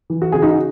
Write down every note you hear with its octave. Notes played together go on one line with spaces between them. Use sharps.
E3
F#4
C#3 G#4
D#4 F#4